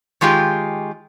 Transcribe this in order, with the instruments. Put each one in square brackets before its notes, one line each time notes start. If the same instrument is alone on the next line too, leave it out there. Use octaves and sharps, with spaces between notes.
[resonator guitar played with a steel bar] D#3 G#3 F4 G4 G5